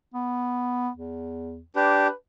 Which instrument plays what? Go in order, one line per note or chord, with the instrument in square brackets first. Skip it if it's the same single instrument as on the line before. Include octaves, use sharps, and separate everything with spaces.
[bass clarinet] B3
E2
[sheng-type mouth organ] D4 G4 [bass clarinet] B4